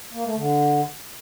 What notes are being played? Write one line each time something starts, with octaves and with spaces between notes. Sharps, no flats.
A#3
A3
D3